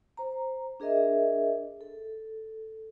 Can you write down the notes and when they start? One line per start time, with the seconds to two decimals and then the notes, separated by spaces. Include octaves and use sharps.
0.17 C5 A#5
0.80 D4 G#4 A#4 D#5 E5
1.81 A4